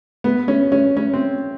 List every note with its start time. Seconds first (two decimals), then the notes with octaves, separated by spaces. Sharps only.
0.24 B3
0.48 C#4
0.72 C#4
0.97 C#4
1.14 C4